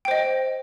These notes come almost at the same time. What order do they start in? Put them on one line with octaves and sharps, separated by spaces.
G5 C5 D#5